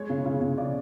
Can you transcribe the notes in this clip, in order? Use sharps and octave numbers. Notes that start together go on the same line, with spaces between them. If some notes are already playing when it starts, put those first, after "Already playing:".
Already playing: G#3 C#5
C#3
C#3
C#3
C#3 D5